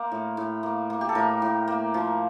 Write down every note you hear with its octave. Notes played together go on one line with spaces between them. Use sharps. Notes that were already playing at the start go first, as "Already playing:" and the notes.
Already playing: A#3 A#4 C5
A2
A2
A#3
A#3
G4
A4
A2 A#4
A2
A#3
F3